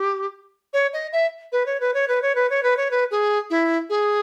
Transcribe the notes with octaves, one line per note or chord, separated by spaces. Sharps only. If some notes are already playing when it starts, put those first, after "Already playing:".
Already playing: G4
C#5
D#5
E5
B4
C#5
B4
C#5
B4
C#5
B4
C#5
B4
C#5
B4
G#4
E4
G#4